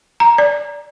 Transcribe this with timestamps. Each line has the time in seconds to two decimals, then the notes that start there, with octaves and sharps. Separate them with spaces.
0.20 A#5
0.38 D5